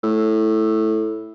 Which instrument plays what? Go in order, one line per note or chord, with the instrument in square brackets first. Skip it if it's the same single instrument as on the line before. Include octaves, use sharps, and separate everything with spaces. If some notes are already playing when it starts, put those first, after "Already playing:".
[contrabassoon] A2